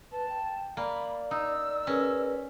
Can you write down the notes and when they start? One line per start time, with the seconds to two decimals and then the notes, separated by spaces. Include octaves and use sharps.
0.12 B4 A5
0.29 G5
0.77 A#3 D5 B5
1.31 D#4 E6
1.87 C#4 G#4 A#4 B4